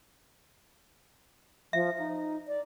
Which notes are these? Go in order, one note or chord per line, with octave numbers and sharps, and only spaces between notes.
F3 E5
D#4
D5